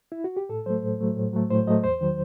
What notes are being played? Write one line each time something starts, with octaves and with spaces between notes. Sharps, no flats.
E4
F#4
G4
A2 A4
F#3 A3 C5
A2
F#3 A3
A2
F#3 A3
A2 C5
F#3 A3 D#5
E2 C5
D#3 F#3